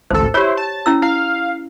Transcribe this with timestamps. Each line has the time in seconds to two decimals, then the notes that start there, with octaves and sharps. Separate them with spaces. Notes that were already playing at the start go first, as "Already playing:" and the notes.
0.11 A1 D2 A4 C5
0.34 E4 G4 C5 C#5
0.57 A5
0.86 C#4 E4 E6
1.02 E4 F5